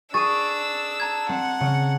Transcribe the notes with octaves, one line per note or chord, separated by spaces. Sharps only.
D4 G#4 C#6 E6 A6 D#7
A5 A#5 G#6
C4 F#5
C#3